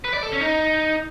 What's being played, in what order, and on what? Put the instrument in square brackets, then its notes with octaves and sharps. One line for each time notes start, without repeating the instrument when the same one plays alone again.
[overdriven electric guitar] B4
D5
A4
C#4
D#4